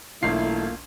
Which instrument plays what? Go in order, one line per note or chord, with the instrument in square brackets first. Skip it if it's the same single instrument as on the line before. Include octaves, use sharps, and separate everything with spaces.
[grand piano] E1 B1 C7 [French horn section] A3 E4 [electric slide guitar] A#3 F4